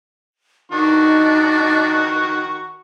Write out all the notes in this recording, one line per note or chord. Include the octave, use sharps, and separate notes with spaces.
D#3 D4 D#4 F#4 C#6